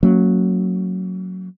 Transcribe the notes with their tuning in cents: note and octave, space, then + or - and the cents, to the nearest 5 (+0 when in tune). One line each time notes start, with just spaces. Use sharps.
F#3 +0 A#3 -35 C#4 +0